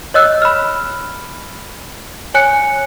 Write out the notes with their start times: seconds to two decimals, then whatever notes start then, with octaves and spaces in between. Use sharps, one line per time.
0.14 C#5 D#5 E6 F#6
0.42 B5 F6
2.34 C#5 G#5 F#6 C#7